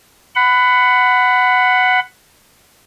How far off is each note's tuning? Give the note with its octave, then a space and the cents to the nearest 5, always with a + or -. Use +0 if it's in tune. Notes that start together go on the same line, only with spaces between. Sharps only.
F#5 +0 B5 +20